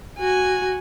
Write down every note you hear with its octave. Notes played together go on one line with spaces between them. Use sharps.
F#4 G#5